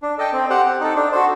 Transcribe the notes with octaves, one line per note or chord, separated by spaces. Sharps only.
D4
A4 D#5 G5
C4
G4 C5 F#5
C4
D#4 A4
D4
F#4 A4 C5